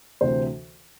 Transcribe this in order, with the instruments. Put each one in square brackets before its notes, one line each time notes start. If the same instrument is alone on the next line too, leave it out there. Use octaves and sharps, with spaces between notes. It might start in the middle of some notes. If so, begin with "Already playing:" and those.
[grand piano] D2 C3 E3 C5